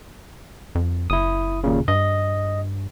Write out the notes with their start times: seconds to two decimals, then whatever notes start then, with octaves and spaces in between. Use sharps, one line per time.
0.75 F2
1.10 F#1 E4 D#6
1.64 D#2 A#2 C#3
1.88 G2 D#5